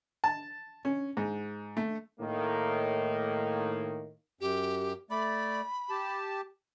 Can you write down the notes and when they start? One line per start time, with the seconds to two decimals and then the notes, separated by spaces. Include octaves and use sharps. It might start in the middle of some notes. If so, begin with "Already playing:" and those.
0.24 A5
0.85 C#4
1.17 G#2
1.77 A3
2.20 A2 D#3 A#3
4.41 F#2 G4
5.10 A3 D5 B5
5.90 G4 A5